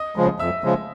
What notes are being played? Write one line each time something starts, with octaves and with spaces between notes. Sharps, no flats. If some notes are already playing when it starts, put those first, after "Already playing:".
Already playing: D#5 D#6
C#3 F3 G#3
F2 E5 E6
C#3 F3 G#3